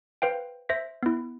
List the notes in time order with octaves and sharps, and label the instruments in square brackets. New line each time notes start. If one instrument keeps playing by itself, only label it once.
[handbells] B4 C5 F5 G5
C5 E5 A#6 B6
B3 E4